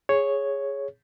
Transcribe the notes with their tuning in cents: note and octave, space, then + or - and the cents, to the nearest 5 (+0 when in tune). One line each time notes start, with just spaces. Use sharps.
G#4 -5 C#5 +0